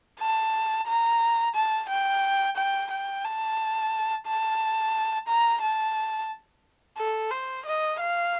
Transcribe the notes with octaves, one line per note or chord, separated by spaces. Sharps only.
A5
A#5
A5
G5
G5
G5
A5
A5
A#5
A5
A4
C5
D#5
F5